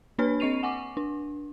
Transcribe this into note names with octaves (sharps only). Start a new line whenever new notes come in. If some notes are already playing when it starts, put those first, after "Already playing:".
A#3 D4 B4 C#5 B5 F6
C4 D#5 C#6 C7 D#7 F7
F#5 G#5 C#6 D6
D4